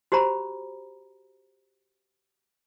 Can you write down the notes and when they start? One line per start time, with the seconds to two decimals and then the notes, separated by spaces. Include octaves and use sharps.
0.12 F#4 G4 C5 A#5 B5